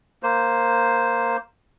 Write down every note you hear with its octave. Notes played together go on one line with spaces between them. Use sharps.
A#3 C5